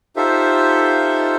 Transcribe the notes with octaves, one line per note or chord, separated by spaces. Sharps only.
D#4 F4 G4 A4 C5 E5